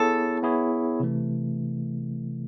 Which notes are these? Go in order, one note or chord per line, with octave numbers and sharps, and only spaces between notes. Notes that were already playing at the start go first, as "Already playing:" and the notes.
Already playing: B3 E4 G#4 A4 C#5
B3 E4 G#4 C#5
C3 E3 A3